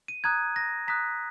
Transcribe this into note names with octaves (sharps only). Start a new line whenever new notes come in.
D#7
A#5 D#6 F#6 G#6
A#6
A#5 D#6 F#6 B6